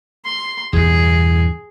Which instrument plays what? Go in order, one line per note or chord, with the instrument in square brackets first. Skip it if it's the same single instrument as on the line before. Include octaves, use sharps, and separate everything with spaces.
[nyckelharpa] C6
[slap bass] E2 G2 B2 [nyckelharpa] G#4